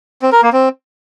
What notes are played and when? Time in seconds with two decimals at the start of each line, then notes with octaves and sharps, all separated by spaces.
0.22 C4
0.32 A#4
0.42 A#3
0.53 C4